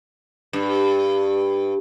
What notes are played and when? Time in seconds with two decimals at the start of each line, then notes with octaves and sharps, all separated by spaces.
0.53 G2